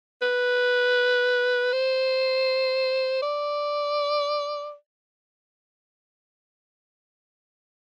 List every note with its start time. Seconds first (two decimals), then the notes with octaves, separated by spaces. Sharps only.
0.22 B4
1.73 C5
3.22 D5